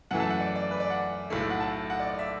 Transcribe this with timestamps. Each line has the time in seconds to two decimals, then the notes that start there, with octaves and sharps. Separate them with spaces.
0.11 F#2 E3 A3 F#5
0.20 A5
0.30 F#5
0.40 D5
0.56 D5
0.71 B4
0.80 D5
0.90 F#5
1.30 B1 A2 A3
1.50 F#5
1.60 A5
1.90 F#5
2.00 D5
2.10 D5
2.19 E5